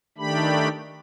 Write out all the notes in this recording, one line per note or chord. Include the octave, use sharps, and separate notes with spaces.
D#3 A3 D4 G4 B5